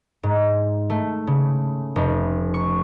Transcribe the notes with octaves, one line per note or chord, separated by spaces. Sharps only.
G#2
A3
C#3
F1
C#6